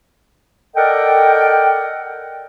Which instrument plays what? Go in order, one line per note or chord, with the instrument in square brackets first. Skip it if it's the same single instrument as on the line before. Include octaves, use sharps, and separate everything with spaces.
[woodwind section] A4 A#4 D5 D#5 F#5 G5